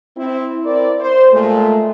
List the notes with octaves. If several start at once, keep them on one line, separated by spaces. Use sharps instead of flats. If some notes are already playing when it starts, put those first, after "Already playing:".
C4 E4
C4 E4 A#4 D5
C5
A#2 G#3 A3